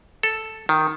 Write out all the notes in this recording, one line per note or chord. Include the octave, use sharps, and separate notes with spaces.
A4
D#3